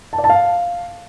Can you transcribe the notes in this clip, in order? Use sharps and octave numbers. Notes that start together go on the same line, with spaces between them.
A5
D5
A5
F5